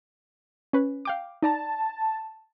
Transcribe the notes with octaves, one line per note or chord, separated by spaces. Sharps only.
C#4 B4
F5 G5 D6
D#4 D5 A5 A#5